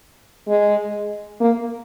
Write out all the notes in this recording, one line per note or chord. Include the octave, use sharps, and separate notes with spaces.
G#3
A#3